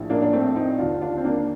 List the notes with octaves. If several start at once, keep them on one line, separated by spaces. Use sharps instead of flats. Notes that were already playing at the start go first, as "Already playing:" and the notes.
Already playing: A#1 A2
A#3 D4
D4
A3 C4
C4 D#4
D#2 D3 D4 F4
D4 F4
C4
A#3 D4